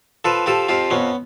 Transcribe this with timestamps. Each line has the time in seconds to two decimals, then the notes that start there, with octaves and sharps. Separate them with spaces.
0.25 F3 A4 B4
0.46 F3 G4 A4
0.69 F2 F4 G4
0.90 F2 B3 C#4